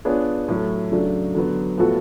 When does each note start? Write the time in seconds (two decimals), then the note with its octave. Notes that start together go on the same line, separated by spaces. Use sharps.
0.05 B3 D4 F4 G#4 C#5
0.48 A2 F#3 A3
0.92 C#3 F#3 A3 D4
1.35 D3 F#3 B3
1.78 A2 F3 B3 F#4 A4